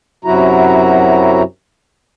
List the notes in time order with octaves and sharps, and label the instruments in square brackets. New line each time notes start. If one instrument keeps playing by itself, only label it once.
[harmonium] F#2 C3 F#3 E4 F#4 A#5